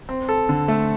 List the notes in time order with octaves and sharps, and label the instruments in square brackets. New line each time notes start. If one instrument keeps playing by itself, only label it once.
[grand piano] C4
A4
D3
A3